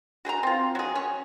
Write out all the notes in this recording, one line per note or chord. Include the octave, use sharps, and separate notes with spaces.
F#4 G#4 G5 A#5
C4 F4
F#3 G#4
C#4 C#5